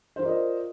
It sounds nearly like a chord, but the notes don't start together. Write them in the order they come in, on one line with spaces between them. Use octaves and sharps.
C5 F4 A#4 D5 D#5